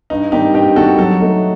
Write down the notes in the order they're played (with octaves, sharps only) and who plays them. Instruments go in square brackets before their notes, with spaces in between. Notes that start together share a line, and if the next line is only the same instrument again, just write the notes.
[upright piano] G2 [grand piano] D#4
[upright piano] D#3 G3 C4 [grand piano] D#4 G4
[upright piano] G2 [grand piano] D#4 G4
[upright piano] D#3 G3 C4 [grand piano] F#4 A4
[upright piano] F#3 [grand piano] F#4 A4
[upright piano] A3 D#4